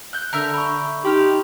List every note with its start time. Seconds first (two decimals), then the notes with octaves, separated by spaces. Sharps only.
0.13 F#6 G6
0.33 D3 A#4 E5 F6 G6
0.54 B5 C#6
1.05 D#4 G4 C6 F6 F7